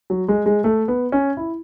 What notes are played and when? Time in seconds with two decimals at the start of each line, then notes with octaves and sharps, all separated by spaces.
0.10 F#3
0.28 G#3
0.46 G#3
0.64 A3
0.88 B3
1.12 C#4
1.37 E4